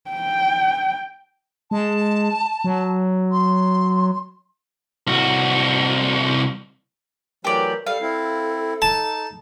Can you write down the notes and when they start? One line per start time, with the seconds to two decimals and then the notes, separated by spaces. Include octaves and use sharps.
0.10 G5
1.71 G#3 A5
2.64 F#3
3.32 C6
5.07 C2 F#4
7.45 E3 F#3 A3 G4 A#4 D5
7.87 G3 A4 F5
8.01 C4 E4
8.82 D#4 A5